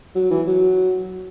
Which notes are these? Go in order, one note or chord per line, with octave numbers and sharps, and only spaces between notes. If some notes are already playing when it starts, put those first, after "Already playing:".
F#3
E3
F#3